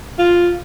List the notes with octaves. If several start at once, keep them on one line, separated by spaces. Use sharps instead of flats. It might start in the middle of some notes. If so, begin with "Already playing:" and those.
F4